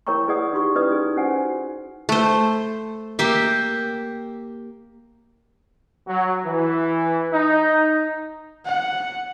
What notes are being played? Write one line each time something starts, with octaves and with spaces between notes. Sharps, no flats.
E4 A#4 C#5 G5 A#5 C#6
E4 G#4 B4 D5 F#5 D#6
D#4 F4 G4 C6 C#6
C#4 E4 B4 D5 D#6
D#4 G#4
C#4 D#4 F#4 C5 F#5 G#5
A3 C5
A#3 G4 E5
F#3
E3
D#4
F#5